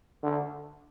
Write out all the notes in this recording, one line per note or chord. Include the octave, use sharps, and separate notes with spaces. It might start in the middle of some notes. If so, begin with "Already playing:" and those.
D3